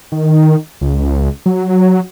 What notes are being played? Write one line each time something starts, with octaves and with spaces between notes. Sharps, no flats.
D#3
C#2
F#3